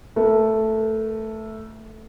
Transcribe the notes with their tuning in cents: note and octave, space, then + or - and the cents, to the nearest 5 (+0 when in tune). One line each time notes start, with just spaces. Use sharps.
A3 +0 A#4 +40